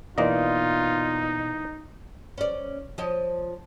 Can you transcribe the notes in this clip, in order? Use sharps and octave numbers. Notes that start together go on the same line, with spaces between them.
B2 E3 A#3 D#4 F4 C5 D5 D#5
C#4 D5
F3 C#5 D#5